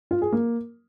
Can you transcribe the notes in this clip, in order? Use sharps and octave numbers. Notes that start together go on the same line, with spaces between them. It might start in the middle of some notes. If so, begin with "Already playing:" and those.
F4
G#4
A#3